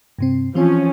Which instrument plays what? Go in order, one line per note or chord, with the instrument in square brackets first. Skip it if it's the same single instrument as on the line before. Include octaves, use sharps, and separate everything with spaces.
[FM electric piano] G2 C3 C4
[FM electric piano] E3 C4 [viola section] F3 C#4